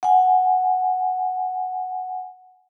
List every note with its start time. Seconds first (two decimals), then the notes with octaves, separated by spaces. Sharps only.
0.03 F#5 G#5